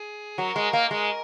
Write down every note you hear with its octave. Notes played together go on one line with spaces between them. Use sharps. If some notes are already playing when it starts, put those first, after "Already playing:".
Already playing: G#4
F#3 A#4
G#3
A#3
G#3 A#4